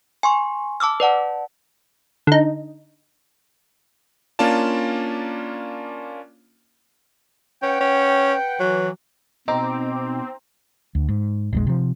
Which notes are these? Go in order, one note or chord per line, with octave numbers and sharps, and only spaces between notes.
G#5 C6 C#6
A5 D6 E6 F6
B4 D5 F#5 A5
D3 D#4
A#3 C#4 D4 F4 D5 A5
C#4 B4 F#5 G5
C#4
E3 F#3
B2 C4 D#4 A#5 D6
D2
G#2
E1 A#1 G#3
C3 F3